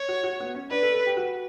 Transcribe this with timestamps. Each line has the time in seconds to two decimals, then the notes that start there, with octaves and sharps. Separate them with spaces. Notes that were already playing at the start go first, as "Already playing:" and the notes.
Already playing: C#5
0.09 F#4
0.24 F#4
0.40 B3
0.55 C#4
0.71 D4 B4
0.83 A4
0.94 A4
1.06 G4
1.17 F#4